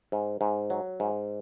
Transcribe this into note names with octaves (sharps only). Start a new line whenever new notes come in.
G#2
G#2
F#3
G#2